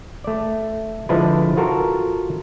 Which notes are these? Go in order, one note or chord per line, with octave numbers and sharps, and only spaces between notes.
A3 D5
D3 F3 G#3 D4 E4 B4
F4 F#4 A4 A#4